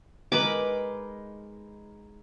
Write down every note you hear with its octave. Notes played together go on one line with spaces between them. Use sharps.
G#3 D#4 A#4 B4 B5 D6